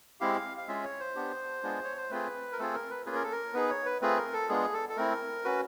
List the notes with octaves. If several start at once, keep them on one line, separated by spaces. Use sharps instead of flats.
G#3 C4 E4 G4 F5
F5
G#3 C#4 F4 G#4 E5
C#5
C5
B3 D4 G4
G#3 B3 D4 F4 G#4
C#5
C5
A3 C4 F4 G#4 B4
A#4
A3 C4 F4 G#4 A4
A#4
B4
A#3 C#4 F4 G#4 B4
A#4
A4
A#4
B3 D#4 G#4 B4
C#5
B4
A3 C4 F4 G#4 B4
A#4
A4
G#3 B3 D4 F4 G#4
A4
A4
A3 C4 E4 A#4
C#4 F#4 B4